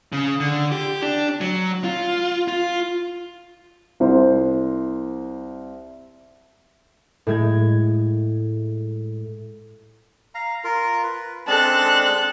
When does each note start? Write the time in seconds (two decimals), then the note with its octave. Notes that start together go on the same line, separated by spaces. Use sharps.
0.12 C#3
0.40 D3
0.72 G4
1.02 D4
1.41 F#3
1.84 F4
2.48 F4
4.00 C2 C5
7.27 A2 G#3 G#6
10.35 F5 A#5
10.64 F4 A#4
11.03 B4
11.47 G#3 C4 D4 A4 F#6